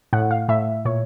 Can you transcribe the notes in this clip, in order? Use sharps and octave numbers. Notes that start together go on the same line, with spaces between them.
A2 F#5
F5
A2 E5
A#2 C#5